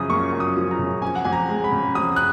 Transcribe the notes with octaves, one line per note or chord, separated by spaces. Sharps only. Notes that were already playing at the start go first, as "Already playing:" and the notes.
Already playing: F#2 C#3 F3 D#6
A#3 C#6
F#2
D#6
F3
A#5
C#3
F2 G#5
F#5
F2 G#5
A#5
G#3
B5
C#3
F2 D#6
F#6